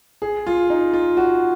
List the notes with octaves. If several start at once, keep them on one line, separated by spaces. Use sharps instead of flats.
G#4
F4
D#4
F4
F#4